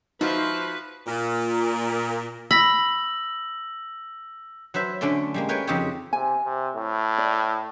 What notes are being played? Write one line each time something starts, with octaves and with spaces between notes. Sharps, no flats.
F3 D#4 F#4 B4 C5 E5
A#2
B5 E6 A#6 F#7
F#3 B4 C5 E5
D3 A3 C#4 D5 C6
G3 G#3 A#3
A#4 B4 C#5 G5 G#5
F2 C#3 C4 D#4 G4 C#5
C3 G#5
C3
A2
D5